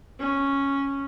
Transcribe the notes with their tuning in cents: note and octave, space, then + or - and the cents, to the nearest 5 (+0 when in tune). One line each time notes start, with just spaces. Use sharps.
C#4 -5